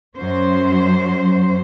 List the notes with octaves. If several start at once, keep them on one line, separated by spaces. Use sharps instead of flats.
F#2 F#3 C#4 C5